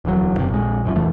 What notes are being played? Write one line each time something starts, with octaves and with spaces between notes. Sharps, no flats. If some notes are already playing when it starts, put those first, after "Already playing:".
D1 E2 D#3 F#3
F#1 D#2 C3
A#1 G#3
F1 F#2 F3
A#1 E2 E3 A3